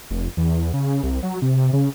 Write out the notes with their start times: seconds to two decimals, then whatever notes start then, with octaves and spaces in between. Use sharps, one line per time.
0.11 F1
0.37 E2
0.74 C#3
1.03 C2
1.23 F#3
1.42 C3
1.73 C#3